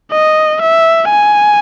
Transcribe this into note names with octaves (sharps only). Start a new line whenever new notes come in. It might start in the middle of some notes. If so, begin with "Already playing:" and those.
D#5
E5
G#5